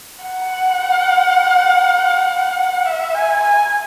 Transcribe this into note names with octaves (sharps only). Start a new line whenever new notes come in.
F#5
E5
G#5
G#5